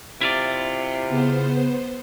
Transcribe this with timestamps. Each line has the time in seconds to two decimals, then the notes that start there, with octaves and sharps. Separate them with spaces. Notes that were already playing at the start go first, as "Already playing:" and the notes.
0.21 C3 E4 F4 D5
1.08 C#3 B3 C5